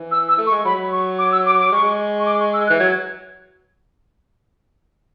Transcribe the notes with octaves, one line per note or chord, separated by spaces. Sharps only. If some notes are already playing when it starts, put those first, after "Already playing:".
Already playing: E3
E6
E6
A3
C#6
G#3
F#3 B5
C#6
D6
E6
D6
D6
G#3 C#6
C#6
D6
C#6
E6
F#6
E3
F#3 G#6